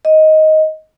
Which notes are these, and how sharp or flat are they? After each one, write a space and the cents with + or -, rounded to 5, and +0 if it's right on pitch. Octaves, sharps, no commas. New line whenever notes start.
D#5 +10